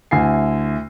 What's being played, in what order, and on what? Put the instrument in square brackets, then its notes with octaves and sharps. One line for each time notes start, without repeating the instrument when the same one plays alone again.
[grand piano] D2 E4 G#5 C7